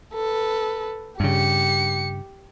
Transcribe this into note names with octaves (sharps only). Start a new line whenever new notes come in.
A4 B4
G2 C#3 G4 C#7